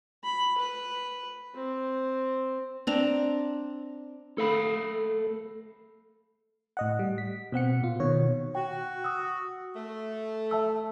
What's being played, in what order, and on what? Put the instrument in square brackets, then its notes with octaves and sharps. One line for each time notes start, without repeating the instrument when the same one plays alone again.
[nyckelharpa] B5
B4
C4
[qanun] C4 D4 A#5
[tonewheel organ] A3 [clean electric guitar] A4 F5 B5
[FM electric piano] A2 D#5 F#5
G3
B6
B2 C4 F#5 C#7
A#2 F4
B2 D#3 C#5
[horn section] F#4 [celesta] G5
[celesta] D#6 E6
[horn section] A3
[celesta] E5 A5 E6